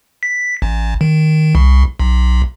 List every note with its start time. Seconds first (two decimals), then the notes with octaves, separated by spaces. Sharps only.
0.23 B6
0.62 A1
1.01 D#3
1.55 C2
2.00 B1